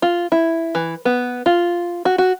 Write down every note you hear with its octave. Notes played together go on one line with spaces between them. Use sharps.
F4
E4
E3
B3
F4
F#4
F#4